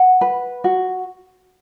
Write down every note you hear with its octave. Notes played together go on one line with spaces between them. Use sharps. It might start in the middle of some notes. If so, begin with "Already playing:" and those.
Already playing: F#5
B4
F#4